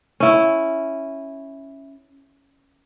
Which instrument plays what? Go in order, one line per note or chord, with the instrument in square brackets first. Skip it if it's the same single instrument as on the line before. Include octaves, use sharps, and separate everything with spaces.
[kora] C#4 E4